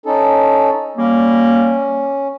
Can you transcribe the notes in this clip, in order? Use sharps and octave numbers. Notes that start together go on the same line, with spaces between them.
C#4 D#4 A4
G3 A#3 C#4